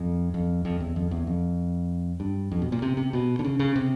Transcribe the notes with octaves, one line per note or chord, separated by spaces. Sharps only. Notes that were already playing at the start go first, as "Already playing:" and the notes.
Already playing: F2
F2
F2
E2
F2
E2
F2
G2
F2
B2
A#2
C3
C3
B2
D3
C#3
C#3
C3